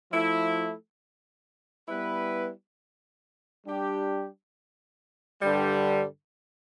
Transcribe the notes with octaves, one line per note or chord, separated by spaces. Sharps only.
F3 A3 E4
G3 B3 E4 B4
G3 D4 G4
G2 D3 G3